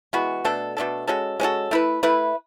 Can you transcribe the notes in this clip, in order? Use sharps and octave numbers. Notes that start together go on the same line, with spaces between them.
E3 G#3 B3 F#4
B2 A3 D4 A4
B2 A3 D4 A4
G#3 C#4 F#4 A4
G#3 C#4 F#4 A4
A3 E4 B4
A3 E4 B4